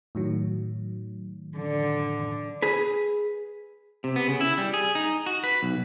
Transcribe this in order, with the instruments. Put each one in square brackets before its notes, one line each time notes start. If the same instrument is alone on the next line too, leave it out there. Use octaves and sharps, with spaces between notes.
[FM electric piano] A2 D#3 F#3
[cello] D3
[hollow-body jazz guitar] G#4 B4
[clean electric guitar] C3
B3
C#3
E4
G3
G#4
D#4
F#4
B4
B1